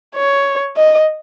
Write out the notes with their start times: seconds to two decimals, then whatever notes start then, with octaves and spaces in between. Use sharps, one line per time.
0.15 C#5
0.77 D#5